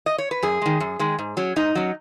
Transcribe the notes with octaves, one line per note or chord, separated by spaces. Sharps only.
D#5
C#5
B4
F#2 G#4
D#3 G#3
F#2
D#3 G#3
G#2
F#3 C#4
G#2 D#4
F#3 C#4